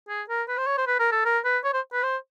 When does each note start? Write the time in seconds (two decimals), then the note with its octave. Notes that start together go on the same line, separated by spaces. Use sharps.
0.09 G#4
0.29 A#4
0.48 B4
0.58 C5
0.67 C#5
0.77 C5
0.87 B4
0.99 A#4
1.12 A4
1.25 A#4
1.45 B4
1.64 C#5
1.73 C5
1.93 B4
2.03 C5